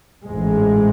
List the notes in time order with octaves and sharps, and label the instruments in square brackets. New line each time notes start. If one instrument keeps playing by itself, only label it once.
[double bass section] A1 G#2 G#3